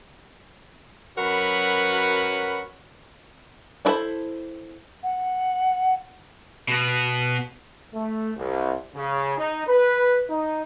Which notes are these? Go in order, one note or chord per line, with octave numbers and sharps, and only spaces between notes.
F#2 F#3 F#4 A#4 B4 B5
D4 E4 A4 C5 B5
F#5
B2 B3
A3
C2
C#3
D#4
B4
D#4